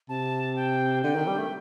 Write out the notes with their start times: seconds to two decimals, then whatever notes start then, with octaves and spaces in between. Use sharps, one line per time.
0.09 C3 A5
0.55 G5
1.03 D3 G5
1.16 D#3
1.27 G3
1.38 A3